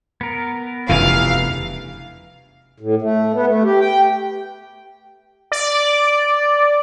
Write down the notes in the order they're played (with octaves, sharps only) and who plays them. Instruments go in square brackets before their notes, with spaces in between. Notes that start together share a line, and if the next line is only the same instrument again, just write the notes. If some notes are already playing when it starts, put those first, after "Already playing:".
[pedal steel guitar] B3 A#4
[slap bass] F1 E2 C#3 [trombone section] G2 E3 [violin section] F5
[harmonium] A2
A3
B3
A3
G4
G5
[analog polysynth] D5